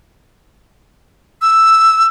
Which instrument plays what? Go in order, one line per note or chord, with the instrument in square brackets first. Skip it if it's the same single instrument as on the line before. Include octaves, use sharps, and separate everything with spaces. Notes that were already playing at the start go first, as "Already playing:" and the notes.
[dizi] E6